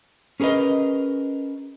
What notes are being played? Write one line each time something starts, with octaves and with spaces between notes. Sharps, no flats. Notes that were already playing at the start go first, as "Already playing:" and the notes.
C#4 G#4 A#4 B4 D#5